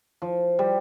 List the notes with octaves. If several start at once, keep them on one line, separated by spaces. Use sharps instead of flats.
F3
G3